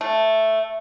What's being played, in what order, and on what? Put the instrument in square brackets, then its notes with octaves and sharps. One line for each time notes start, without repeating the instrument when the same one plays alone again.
[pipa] A3